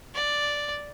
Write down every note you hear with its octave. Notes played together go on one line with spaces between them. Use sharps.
D5